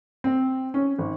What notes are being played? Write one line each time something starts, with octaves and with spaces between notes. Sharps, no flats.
C4
C#4
G#1